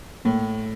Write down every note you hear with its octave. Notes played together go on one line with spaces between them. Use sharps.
A2 A#3